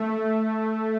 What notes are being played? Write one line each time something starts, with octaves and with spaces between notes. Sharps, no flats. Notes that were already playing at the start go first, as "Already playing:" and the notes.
Already playing: A3